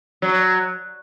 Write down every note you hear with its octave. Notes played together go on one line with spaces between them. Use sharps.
F#3